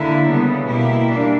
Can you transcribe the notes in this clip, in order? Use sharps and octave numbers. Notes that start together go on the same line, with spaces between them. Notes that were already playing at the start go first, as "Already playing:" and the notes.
Already playing: D3 A#3 E4
C#3 G3 B3
B2 A#3 E4 G4
G3 A#3 D4